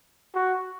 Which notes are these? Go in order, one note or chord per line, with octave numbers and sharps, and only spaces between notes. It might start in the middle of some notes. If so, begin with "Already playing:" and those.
F#4